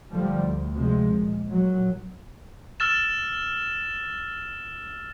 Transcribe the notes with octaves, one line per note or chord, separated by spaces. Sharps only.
A2 D3 F3 G3
D2
C3 F3 G#3
A#2
A#2 F#3
E6 F6 A6 E7